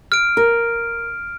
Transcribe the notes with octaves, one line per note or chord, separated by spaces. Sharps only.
F6 D7
A#4